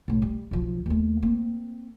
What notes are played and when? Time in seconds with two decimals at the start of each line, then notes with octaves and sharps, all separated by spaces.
0.08 B1 A2
0.22 G3
0.51 B1 F3
0.86 D#2 A3
1.22 A#3 C4